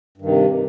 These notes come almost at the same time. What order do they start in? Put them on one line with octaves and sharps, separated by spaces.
G2 D#3 C3